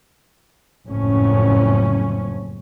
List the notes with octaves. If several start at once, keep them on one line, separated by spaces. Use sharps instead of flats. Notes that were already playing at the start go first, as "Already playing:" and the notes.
F#1 F2 A2 C#4